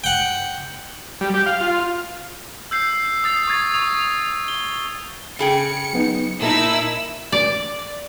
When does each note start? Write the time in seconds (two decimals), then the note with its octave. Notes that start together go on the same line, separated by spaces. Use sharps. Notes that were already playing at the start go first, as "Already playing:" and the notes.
0.04 F#5 G5
1.21 G3
1.34 G4
1.46 F5
1.61 F4
2.71 E6 G6 C7
3.24 D#6 A6 C7
3.48 C#6 D#6 G#6 A6
3.74 C#6 D#6 F7
4.48 G7
5.39 C#3 G#4 G5 C#7
5.93 F#3 B3 D#4
6.42 A#2 D#4 E4 A#4 A5 E6
7.32 D5